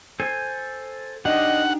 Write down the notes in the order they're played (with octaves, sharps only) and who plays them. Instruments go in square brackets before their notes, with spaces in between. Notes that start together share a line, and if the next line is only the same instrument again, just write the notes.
[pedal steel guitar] A4 C5 G#5
[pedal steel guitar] D4 D#4 G4 [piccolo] D#5 [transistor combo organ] F#5